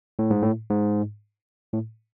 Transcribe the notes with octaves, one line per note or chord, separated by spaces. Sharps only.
A2
G#2
A2
G#2
A2